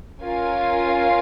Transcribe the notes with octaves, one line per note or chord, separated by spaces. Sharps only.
C#4 F4 A#4 F5 G#5